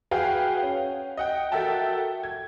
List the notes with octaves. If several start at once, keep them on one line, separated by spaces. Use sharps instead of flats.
F#4 G#4 B4 F5 G5 G#5
C#4
D#5 F#5 G5
F#4 A4 A#4 E5 G5 A5
G#6